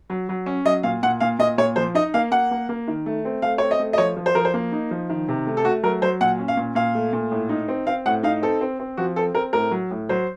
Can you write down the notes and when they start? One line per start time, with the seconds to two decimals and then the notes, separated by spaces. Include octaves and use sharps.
0.10 F#3
0.29 F#3
0.46 C#4
0.65 F#3 D#5
0.83 A#2 F5
1.03 A#2 F#5
1.20 A#2 F5
1.39 A#2 D#5
1.58 A#2 C#5
1.76 F3 C5
1.95 D#4 D#5
2.14 A#3 F5
2.31 A#3 F#5
2.51 A#3
2.69 A#3
2.88 D#3
3.06 A3
3.25 C4
3.42 A3 F5
3.58 C4 C#5
3.71 D#5
3.79 A3
3.93 D#5
3.98 F3 C#5
4.17 F3
4.26 C5
4.35 F3 A#4
4.45 C5
4.54 A#3
4.72 D#4
4.91 F3
5.10 D#3
5.28 C3
5.47 A3
5.57 A4
5.65 A3 F#4
5.83 F#3 A#4
6.02 F#3 C5
6.21 A#2 F#5
6.39 C#4
6.48 F5
6.57 A#2
6.75 A#2 F5
6.95 A3
7.13 A#2
7.31 A2
7.49 D#4
7.68 C4
7.87 C4 F5
8.06 A2 F#5
8.23 D#4 F5
8.42 C4 A4
8.61 C4
8.79 C4
8.97 F3 F#4
9.16 C4 A4
9.35 C4 A#4
9.53 A2 A#4
9.71 F#3
9.91 A2
10.09 F#3 C5